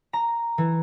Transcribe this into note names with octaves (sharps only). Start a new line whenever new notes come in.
A#5
E3